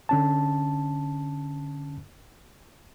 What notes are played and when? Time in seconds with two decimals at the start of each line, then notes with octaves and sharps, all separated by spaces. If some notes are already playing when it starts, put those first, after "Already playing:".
0.09 D3 C#4 A5